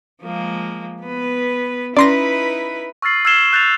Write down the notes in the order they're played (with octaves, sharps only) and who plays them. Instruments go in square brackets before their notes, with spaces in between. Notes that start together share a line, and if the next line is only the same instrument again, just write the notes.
[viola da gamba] F3 G#3 A#3
B3 B4
[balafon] C#4 [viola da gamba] D#4 E4 B4 [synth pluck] D5 C6 A#6
[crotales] C#6 E6 F6 A6 C7 F#7
E6 F6 G#6 C7 E7 G7
F#6 G6 A6 C7 F7